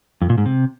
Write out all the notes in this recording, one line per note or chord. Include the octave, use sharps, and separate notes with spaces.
F2
A#2
G#2
C3